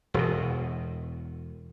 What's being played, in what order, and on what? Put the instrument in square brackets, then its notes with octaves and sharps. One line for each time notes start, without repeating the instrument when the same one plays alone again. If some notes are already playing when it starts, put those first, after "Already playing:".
[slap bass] E1 E2 B2